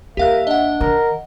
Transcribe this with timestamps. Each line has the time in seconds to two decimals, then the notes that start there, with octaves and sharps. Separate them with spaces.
0.17 D#2 G4 A#4 E5 F5 F#6
0.47 D4 D#5 F#5
0.81 D#3 A#4